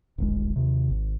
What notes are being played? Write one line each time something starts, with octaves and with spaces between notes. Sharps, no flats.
D1 G#1 G#3
D#2 C3
G#1